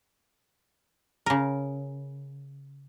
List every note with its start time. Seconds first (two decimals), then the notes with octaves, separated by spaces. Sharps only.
1.26 C#3 A#4